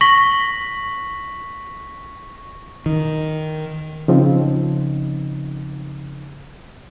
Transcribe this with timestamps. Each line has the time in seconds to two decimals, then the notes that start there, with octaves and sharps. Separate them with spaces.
0.01 C#6 A#6 B6 F#7
2.86 D#3
4.08 C#3 F3 C4 D#4